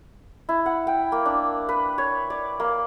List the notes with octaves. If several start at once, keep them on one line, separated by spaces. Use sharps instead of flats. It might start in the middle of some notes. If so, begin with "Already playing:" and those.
E4
F#5
G5
A#3
D4
B4
C#5
D5
A#3